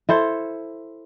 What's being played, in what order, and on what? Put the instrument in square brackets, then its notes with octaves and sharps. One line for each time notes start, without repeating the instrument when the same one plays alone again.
[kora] E4 A4 C5